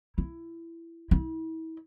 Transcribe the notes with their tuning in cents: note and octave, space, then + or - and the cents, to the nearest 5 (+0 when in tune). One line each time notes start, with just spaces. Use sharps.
E4 +15
E4 -35